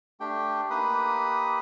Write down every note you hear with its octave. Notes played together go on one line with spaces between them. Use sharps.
A3 D4 G4 G5
A#3 D#4 G4 B4 B5 D#6